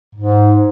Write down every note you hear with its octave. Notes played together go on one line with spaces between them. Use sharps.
G#2